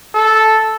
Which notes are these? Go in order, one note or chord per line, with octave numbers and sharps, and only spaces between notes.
A4